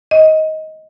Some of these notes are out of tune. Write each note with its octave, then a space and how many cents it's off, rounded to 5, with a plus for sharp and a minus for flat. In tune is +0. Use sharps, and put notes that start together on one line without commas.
D#5 +15